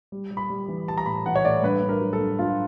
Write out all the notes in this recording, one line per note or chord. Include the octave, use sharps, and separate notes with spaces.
G3
G3
B5
G3
E3
G3 A5
A#5
A2 B5
E3 F#5
C#5
A2 D5
G2 B4
G2
A#4
F#3
A4
G2
G2 F4